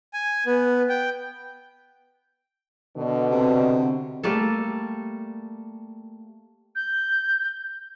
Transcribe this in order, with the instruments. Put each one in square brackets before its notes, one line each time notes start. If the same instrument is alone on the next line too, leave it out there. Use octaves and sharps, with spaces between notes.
[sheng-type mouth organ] G#5
B3
G5
[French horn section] B2 D3
[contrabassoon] C3
[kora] G3 A3 A#3 A4
[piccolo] G6